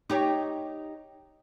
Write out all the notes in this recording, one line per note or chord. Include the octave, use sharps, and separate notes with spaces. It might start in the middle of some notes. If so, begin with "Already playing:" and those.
D#4 G4 C#5